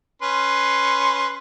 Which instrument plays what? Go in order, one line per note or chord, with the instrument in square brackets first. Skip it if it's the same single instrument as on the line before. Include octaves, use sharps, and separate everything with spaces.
[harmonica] C#4 B4 C6